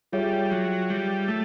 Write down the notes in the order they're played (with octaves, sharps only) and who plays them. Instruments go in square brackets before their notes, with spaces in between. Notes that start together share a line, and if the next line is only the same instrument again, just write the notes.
[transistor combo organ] G3 [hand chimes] F4 G#4 C#5 E5 G5
[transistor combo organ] F#3
G3
A3